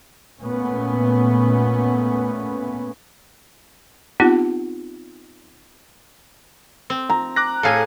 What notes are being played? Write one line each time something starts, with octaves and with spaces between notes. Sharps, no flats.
A#2 A3 B3 C#4
B3 C4 D#4 F4 G4 F#5
C4
A#5
D6 F#6 A#6
A2 G#4 A4 F5 G#5